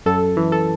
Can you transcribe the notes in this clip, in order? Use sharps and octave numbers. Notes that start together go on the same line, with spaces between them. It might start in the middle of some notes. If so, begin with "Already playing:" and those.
F#2 A4
E3
A4